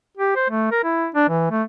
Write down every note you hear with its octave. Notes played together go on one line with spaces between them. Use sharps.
G4
C5
A3
A#4
E4
D4
E3
A3